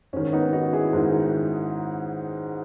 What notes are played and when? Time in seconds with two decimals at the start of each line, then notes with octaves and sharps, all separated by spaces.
0.13 G#2 D#3 C#4
0.33 B3 D#4
0.53 D#4 F#4
0.73 E4 G#4
0.93 G#2 D#3